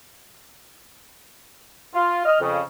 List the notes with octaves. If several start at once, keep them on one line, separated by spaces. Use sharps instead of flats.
F4
D#5 F6
F2 C#3